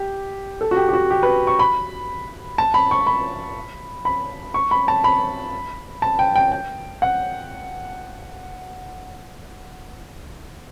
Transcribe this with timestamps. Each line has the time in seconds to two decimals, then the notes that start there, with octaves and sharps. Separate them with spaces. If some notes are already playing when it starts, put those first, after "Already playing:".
Already playing: G4
0.61 A4
0.71 F#4
0.76 G4
0.89 G4
0.93 F#4
1.10 G4
1.23 B4
1.47 C#6
1.59 B5
2.58 A5
2.74 B5
2.91 C#6
3.07 B5
4.05 B5
4.54 C#6
4.71 B5
4.88 A5
5.04 B5
6.02 A5
6.19 G5
6.35 G5
6.52 G5
7.02 F#5